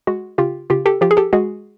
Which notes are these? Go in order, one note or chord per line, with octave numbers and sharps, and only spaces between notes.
G#3 F#4
C#3 F4 G4
C#3 F4 G4
G4 A4
F3 F4 G4
G#4
G4 A4
G#3 F#4 G#4